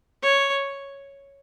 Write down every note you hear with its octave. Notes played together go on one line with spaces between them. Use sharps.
C#5